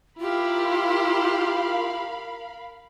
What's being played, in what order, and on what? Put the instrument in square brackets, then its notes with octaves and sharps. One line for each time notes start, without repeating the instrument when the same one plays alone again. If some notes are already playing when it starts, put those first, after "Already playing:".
[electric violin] E4 G4 [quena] F4 [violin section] A#4 F5 B5